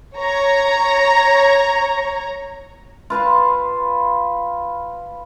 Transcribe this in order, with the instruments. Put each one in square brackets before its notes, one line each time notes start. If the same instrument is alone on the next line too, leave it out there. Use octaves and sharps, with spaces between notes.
[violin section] C#5 A#5
[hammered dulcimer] F4 B4 A5 C6